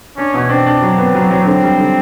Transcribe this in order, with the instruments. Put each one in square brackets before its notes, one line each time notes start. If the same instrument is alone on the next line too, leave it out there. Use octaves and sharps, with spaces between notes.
[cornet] C#4 [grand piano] D4
[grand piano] B2
[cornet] C4 [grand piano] D4
[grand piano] D4
F#3
B3
F#3
F#3
[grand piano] D3 [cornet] C4
[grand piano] G3
D3